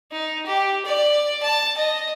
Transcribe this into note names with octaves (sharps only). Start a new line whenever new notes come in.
D#4
G4
D5
A5
D#5